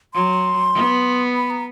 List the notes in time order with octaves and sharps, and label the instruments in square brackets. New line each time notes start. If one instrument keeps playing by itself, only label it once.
[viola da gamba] F#3 [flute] C6
[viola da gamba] B3
[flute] B5
A#5